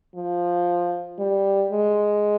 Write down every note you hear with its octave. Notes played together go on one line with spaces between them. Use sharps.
F3
G3
G#3